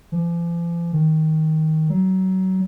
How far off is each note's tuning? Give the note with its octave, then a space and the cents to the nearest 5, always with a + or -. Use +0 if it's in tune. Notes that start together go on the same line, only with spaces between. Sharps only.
F3 -45
D#3 +15
F#3 +25